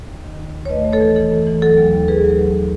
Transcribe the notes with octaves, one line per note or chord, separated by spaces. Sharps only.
D#2
D#3
D#2
D#2
C#5
A3 B4 D#5
A3
A4 C#5
E3
E3 A4
F#2
E3
F#3 A4
D#2
D#2
D#2 G#4 B4
F#3
D#2